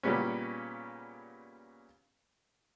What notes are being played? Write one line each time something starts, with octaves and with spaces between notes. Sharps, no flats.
A#2 C#3 G3 B3 C#4